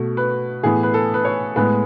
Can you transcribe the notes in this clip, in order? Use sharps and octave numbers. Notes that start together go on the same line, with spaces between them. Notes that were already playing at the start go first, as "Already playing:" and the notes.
Already playing: B2 A3
B4
A2 E3 B3 G#4
B4
A4
B4
C#5
A2 G#3 B3 B4